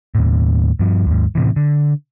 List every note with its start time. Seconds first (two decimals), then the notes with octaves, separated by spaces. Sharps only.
0.15 D#2 A2
0.79 G2 F3
1.06 D#2 G#2
1.35 A2 C3 E3
1.56 D3